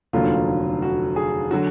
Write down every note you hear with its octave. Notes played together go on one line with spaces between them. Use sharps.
F1 D#2 D3 F#3 F4
F#4
G#4
D3 F#3 F#4